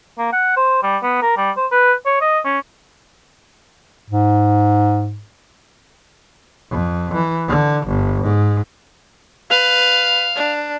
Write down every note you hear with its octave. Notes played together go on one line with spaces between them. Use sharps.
A#3
F#5
C5
G3
B3
A#4
G3
C5
B4
C#5
D#5
C#4
G#2
F2
E3
D3
G1
G#2
B4 F5
D4